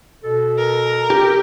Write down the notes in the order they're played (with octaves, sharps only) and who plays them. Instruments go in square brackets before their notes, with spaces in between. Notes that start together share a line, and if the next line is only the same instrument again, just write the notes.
[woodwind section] B2 A4
[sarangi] A#4
[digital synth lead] G4